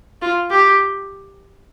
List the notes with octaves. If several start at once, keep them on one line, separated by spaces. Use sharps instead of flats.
F4
G4